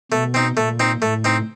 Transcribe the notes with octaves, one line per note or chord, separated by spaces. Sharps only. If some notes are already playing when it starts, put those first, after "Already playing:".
B2 A3
C4 D#4
A#2 A3
C4 D#4
A2 A3
C4 D#4